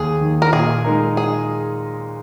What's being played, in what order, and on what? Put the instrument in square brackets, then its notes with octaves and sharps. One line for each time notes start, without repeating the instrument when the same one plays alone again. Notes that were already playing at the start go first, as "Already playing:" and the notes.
Already playing: [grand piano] D#2 [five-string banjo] G#4
[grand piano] D#3 A#3
[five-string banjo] A#4
[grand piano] A#2 [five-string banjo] G#4
[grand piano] G#3 D#4 A#4
[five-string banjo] G#4